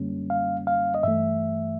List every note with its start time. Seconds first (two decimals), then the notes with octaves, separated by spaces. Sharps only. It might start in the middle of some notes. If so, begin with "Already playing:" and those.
Already playing: F#2 D3 G3 A#3 C#4
0.30 F5
0.67 F5
0.94 D#5
1.03 G2 E3 A3 E5